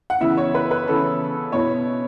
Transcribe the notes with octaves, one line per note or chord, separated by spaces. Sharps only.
F#5
C#3 E3 B3 E4 E5
C#5
B4
B4
C#3 E3 B3 E4 A4
B2 B3 E4 C#5